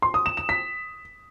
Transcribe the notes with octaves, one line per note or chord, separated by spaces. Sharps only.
C6
D#6
E7
E7
B6